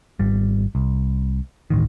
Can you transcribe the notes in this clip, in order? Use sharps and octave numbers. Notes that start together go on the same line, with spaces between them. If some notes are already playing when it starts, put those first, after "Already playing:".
G#1 G3
C2
D1 A1 D#3